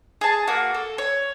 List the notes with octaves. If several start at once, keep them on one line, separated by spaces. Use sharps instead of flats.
G#4 A5
A#3 F#4
A4
C#5